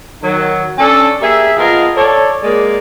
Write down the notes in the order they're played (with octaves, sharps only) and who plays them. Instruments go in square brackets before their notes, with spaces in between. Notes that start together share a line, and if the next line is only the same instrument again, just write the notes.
[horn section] D#3 F#3
C#4 D4 A4
A#3 G4 G#4 E5
F3 B3 F4 G#4 A#4 D#5
A4 C#5 D5
G#3 A#3 D5